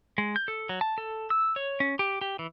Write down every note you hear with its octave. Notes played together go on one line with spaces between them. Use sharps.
G#3
G6
A4
F#3
A5
A4
E6
C#5
C#4
G4
G4
E3